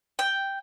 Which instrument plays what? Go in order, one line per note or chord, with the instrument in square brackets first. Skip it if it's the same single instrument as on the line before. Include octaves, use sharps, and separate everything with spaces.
[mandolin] G5